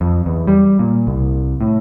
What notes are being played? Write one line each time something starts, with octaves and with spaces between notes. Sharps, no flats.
F2
E2
G3
A#2
C2
A2